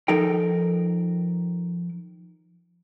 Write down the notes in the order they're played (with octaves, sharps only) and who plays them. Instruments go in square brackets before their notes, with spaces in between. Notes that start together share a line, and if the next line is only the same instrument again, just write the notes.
[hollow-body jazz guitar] F3 D#4 A4 A#4 G5